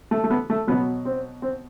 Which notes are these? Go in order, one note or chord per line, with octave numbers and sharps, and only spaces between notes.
A3
A3
B3
A3
B2 F#3 B3
C4
C4